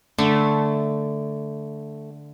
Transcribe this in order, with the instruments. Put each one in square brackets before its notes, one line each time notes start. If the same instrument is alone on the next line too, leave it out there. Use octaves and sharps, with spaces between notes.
[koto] D3 [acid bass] A3